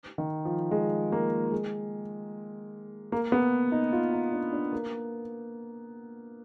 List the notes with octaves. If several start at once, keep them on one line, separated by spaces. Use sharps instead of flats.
D#3
F3
G#3
A#3
G#3
A#3
B3
D#4
F4
D#4
D4
D4
A#3